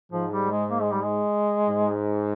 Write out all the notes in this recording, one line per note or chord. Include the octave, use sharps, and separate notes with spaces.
G#2 F3
G3
G#3
A#3
G#3
G3
G#3
G#2